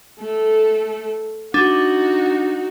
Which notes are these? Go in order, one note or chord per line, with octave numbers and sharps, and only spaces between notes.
A3 A4
D4 D#4 F#4